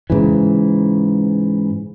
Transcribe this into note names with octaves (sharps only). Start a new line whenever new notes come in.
G#2 C#3 E3